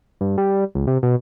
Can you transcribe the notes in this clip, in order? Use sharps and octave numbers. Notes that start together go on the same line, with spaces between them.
G2
G3
C#2
C3
B2